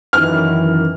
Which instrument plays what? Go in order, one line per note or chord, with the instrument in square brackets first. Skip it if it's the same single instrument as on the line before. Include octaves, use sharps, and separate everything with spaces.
[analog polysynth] F#2 D#3 E3 [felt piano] F6